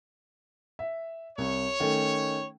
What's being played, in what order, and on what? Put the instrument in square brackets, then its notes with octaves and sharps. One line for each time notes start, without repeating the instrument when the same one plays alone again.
[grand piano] E5
[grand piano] C2 [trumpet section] C#5
[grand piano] D#3 A3 C#4